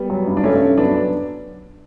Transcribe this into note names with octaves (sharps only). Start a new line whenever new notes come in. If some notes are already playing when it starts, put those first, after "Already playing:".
Already playing: G3 B3
F#3
G2
D4
G2 A3 C#4
G2
F#3 B3 D4
F#3